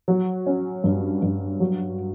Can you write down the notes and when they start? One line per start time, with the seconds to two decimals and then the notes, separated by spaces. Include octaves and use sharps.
0.08 F#3
0.46 C#4
0.84 G2
1.22 G2
1.60 F#3